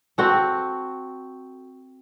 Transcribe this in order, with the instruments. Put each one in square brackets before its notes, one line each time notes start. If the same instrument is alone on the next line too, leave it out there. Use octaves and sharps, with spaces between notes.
[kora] C4 F#4 A4